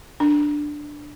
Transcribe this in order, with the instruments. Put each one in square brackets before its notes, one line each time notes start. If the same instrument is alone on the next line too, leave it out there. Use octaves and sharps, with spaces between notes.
[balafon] D4